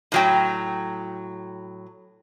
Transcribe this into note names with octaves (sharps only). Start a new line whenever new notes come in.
A2 F#3 G5